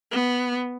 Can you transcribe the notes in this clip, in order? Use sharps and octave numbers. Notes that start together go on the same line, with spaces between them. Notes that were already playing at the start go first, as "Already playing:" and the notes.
B3